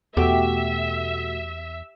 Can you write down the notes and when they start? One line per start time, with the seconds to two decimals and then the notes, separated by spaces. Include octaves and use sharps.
0.17 E2 B2 A3 F#4 G4 E5